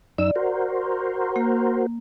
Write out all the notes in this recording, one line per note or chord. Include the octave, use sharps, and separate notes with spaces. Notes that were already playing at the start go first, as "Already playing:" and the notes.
F#2 D#4 D5 E6
F#4 A#4 C5
A#3